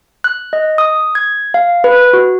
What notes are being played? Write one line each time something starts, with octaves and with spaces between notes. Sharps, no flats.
F#6
D#5
D#6
G#6
F5
B4
F#4